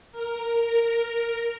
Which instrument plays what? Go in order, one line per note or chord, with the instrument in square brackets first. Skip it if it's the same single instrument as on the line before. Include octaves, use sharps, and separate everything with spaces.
[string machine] A#4